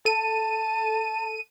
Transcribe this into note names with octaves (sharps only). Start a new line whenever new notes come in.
A4 A5 D#7